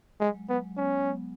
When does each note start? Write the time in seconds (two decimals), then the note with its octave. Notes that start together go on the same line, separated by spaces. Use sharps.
0.20 G#3
0.24 F#3
0.35 G#3
0.49 F#3 B3
0.64 G#3
0.77 B3 C#4